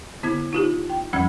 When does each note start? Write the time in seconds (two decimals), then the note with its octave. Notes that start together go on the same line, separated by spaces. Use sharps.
0.23 D3 B3 E4 G#6
0.53 D#4 F4 G4
0.90 G5
1.13 F2 F3 G3 C#4 E6 G#6